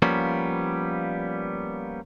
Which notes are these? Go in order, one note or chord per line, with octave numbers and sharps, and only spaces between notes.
F3 G3 A#3 B3 C#4